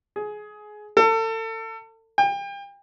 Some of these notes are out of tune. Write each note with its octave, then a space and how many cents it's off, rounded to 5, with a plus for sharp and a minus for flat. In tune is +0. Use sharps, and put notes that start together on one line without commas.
G#4 +20
A4 +35
G5 +35